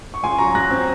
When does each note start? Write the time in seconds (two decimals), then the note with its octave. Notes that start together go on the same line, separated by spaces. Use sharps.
0.14 C#6
0.23 C#2 G#5 C6
0.38 F#3 A#5 C#6
0.54 C#2 F#6 A#6
0.71 C4